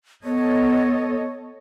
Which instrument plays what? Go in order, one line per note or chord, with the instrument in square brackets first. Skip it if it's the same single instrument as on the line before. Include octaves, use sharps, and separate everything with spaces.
[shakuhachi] B3 [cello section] A4 C#5 D#5